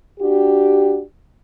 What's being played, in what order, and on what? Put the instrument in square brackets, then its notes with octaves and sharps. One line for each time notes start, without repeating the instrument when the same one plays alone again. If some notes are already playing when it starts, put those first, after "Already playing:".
[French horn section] D4 F#4 G4